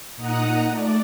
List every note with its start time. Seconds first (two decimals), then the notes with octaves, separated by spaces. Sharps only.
0.16 A#2 D#4 F#5 A#5 D#6 F#6
0.67 A3 D5